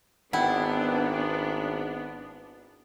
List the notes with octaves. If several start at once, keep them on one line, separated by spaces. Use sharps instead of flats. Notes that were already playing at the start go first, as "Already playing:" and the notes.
G#1 B3 D4 E4 E5 F#5 G5